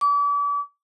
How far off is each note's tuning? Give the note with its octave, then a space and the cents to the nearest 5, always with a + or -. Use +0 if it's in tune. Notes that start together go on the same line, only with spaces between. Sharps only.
D6 -40